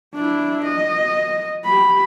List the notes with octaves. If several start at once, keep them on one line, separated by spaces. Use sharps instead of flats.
D4 E4
D#5
G4 B5